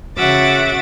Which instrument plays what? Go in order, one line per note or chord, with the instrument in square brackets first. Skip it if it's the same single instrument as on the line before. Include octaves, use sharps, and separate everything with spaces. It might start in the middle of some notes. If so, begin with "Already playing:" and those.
[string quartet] C#3 F#4 E5 F#5 D6 A6